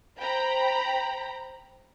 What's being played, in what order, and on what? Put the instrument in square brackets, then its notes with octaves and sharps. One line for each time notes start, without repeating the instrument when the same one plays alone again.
[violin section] C5 G5 A#5 B5